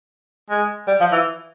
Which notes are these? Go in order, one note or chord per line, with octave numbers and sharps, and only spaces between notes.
G#3
G3
F3
E3